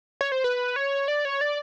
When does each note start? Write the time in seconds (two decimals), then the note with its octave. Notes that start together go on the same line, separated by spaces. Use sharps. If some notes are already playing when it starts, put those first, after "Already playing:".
0.21 C#5
0.32 C5
0.44 B4
0.76 C#5
1.08 D5
1.25 C#5
1.41 D5